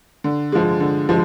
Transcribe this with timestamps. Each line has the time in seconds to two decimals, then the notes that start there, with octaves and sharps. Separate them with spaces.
0.24 D3
0.52 F3 G#3
0.80 D3
1.09 F3 G#3